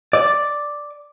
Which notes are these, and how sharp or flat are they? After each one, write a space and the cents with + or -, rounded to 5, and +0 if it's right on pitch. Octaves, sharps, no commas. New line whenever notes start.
D5 +0